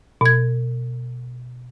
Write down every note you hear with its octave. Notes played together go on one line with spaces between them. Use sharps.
B2 G#6